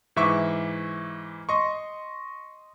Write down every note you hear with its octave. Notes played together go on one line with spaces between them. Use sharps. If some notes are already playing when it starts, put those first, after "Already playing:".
G#2 E3 E5 C#6 D6
D#5 C6 C#6